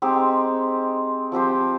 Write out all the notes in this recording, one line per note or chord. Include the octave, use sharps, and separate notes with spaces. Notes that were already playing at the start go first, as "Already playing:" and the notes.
G#3 C4 D#4 G4
F3 C4 G4 C5